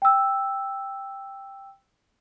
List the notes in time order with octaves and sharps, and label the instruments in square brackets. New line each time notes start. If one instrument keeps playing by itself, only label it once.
[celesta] G5 E6